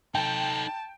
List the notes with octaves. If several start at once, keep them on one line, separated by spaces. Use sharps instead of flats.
D#4 A4 G5 A5